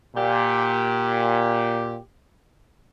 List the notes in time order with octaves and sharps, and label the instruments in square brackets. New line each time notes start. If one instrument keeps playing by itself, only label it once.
[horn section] A#2 G4